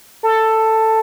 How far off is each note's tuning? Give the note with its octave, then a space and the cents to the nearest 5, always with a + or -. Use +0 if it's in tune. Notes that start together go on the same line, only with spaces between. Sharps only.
A4 +10